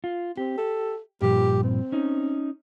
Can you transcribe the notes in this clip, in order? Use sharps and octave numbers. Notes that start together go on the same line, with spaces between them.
F4
C4 G4
A4
G2 A#2 F3 G4
C4
C#4 D#4